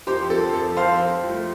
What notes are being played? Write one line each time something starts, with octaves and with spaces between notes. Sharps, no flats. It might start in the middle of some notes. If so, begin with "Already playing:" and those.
F2 G4 C5
F3 C4 A4
F2 A4
F3 C4 C5 F5
F2
F3 A3